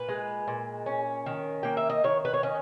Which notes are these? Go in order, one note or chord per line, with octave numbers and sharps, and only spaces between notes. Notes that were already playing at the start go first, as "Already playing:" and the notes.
Already playing: A#2 B4
G#3
A#2
C#4
D#3
A#3 G5
E5
D#5
D#3 C#5
B4
C#5
C#4 D#5